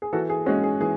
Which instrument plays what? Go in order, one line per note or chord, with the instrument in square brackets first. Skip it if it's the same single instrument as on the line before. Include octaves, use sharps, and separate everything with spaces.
[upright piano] G#4
E3 F#4 A4
G#4
G#3 C#4 F#4
G#4
E3 G#4